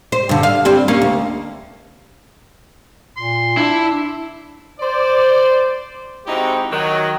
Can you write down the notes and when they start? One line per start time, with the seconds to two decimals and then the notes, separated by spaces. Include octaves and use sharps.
0.12 C5
0.29 G2 D3
0.43 F5
0.65 G3 C4
0.88 A#3 C#4
1.02 D2
3.17 A#2 C6
3.57 D4 E4
4.80 C5 D5
6.26 G#3 C4 D#4 E4 F#4 G4
6.71 D#3 F#3